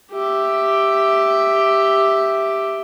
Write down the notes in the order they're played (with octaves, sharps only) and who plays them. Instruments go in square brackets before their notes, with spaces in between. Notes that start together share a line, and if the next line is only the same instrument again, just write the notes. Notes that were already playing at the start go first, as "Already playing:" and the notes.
[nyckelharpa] G4 E5